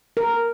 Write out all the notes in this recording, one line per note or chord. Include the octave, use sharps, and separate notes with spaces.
A#4